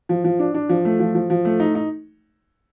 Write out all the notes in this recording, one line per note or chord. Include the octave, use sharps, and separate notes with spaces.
F3
F3
D4
D4
F3
A3
F3
F3
F3
A3
D#4
D#4